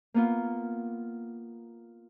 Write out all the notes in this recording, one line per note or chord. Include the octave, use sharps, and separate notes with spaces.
A#3 B3 F4